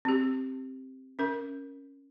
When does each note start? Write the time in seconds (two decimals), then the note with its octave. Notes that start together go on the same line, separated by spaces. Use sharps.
0.05 C4 G4
1.19 C#4 A#4